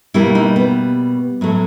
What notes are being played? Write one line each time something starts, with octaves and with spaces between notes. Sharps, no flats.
B2 G3 A#3 E4
D#4
B3
A2 F#3 A3